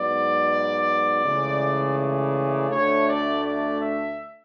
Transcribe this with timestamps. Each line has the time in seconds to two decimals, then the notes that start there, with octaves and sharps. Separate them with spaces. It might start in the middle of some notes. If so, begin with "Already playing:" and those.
Already playing: G#2 F#3 B3 D5
1.24 C#2 C#3 E3 A3
1.97 D5
2.70 D2 D3 A3 C#5
3.06 D5
3.43 D5
3.80 E5